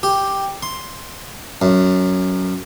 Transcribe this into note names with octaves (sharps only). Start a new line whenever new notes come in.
G4
C6
F#2